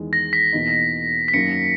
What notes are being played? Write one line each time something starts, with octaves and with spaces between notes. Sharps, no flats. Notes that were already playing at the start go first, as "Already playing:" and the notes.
Already playing: E2 D#3 G#3
A#6
B6
E2 B2 A#3 D#4
B6
F#2 D#3 F#3 A#3 C#4 C#7